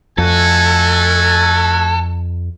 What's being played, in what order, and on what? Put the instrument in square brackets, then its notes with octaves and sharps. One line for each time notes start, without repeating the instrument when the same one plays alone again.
[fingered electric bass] F2 [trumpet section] A3 F#4 G#5 [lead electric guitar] A4